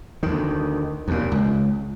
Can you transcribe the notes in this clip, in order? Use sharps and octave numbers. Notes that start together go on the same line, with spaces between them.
D2 D#3
D#2 A#2
C#2